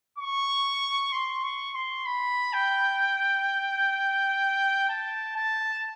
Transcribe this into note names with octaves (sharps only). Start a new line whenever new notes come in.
C#6
C6
C#6
C6
B5
G5
A5
A5